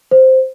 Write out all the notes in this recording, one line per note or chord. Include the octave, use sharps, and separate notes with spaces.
C5